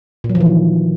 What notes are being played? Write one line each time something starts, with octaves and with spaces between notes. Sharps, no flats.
A#2
F#3
F3
E3
D#3